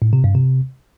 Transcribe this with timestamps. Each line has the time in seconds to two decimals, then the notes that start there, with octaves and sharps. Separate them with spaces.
0.02 A2
0.13 C3
0.24 G2
0.35 C3